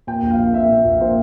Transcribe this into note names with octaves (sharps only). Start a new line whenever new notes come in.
A#2 G5
A#1
F5
A#2
A#2 E5
A#2
A#1
A#2 C5